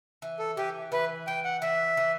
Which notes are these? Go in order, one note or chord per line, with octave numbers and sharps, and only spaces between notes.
E3
A4
E3 G4
E3 B4
E3 G5
F#5
E3 E5
E3